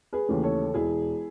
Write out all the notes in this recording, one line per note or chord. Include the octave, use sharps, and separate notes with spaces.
G#4 B4
D#2 C#3 E3 A3
A4 C#5
E1 E4 G#4